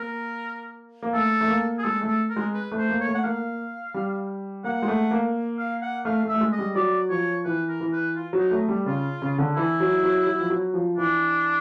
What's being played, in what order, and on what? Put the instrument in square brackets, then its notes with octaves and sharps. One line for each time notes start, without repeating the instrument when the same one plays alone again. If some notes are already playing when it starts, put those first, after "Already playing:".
Already playing: [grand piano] A#3 [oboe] A#4
[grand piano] A#3
[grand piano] A3 [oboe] A4
[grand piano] A3
A#3
[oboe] G#4
[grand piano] G#3 [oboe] A4
[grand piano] A3
[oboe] A4
A#4
[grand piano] G#3
[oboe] B4
[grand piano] A3
[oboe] C5
[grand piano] A#3
[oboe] C#5
[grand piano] A3
[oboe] F#5
[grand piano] A#3 [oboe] F5
[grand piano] G3
[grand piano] A#3 [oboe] F#5
[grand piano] G#3
A3
A#3
[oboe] F5
F#5
[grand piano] A3 [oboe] F5
[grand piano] A3
[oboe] E5
[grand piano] A3
G#3
[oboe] D#5
[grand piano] G3
[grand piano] F#3 [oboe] D5
[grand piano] F3 [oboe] C#5
[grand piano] E3 [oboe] B4
[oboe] A#4
[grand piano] E3
[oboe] B4
F4
[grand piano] F#3
[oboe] D#4
[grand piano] A3
G3
[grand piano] C#3 [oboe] F4
[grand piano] C#3
D3
[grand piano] E3 [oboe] E4
[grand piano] F#3
F#3
F#3
F3
F#3
F3
[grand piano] E3 [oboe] D4